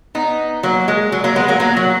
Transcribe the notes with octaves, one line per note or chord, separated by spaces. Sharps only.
B3 D#4
F#3 A#3
G#3
F#3
F#3 A#3
G#3 B3
F#3 A#3
F#3 A#3
F#3